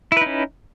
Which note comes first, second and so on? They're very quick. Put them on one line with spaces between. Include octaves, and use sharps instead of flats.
E4 B4 D#4 C#4